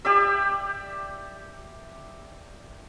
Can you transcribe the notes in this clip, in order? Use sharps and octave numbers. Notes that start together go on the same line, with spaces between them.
G4 D5 E5